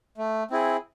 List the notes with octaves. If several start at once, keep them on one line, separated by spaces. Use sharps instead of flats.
A3
C4 E4 G#4